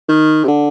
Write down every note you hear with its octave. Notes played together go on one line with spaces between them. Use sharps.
D#3
C3
D3